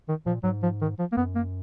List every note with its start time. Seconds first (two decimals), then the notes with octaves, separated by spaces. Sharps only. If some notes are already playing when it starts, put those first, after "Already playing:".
0.08 D#3
0.26 A#2 F3
0.44 G#2 F#3
0.63 F3
0.81 D#3
0.99 F3
1.12 A#3
1.17 F#2 B3
1.35 A#3